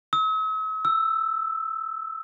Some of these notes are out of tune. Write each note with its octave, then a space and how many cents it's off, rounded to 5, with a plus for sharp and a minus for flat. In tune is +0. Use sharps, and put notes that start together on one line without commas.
E6 -45
E6 +5